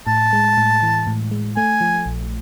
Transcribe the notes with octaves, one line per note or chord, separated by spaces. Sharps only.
A2 A5
G#3
A2
E3
A2
G#3
A3 G#5
F3
A#1